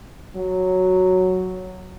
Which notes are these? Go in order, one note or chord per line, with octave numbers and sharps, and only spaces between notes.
F#3